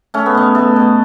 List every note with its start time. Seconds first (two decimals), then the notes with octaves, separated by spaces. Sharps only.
0.14 A3 C#4
0.26 B3
0.35 B2 C#4
0.55 A3 A4
0.76 B2